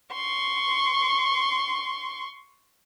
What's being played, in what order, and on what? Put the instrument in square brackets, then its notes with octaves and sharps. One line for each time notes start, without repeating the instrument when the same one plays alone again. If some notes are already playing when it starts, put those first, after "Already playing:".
[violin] C6 C#6